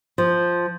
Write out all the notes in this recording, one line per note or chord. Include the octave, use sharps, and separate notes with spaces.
F3